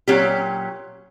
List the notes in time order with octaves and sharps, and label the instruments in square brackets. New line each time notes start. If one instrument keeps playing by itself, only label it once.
[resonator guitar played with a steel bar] A#2 F#3 C#4 G4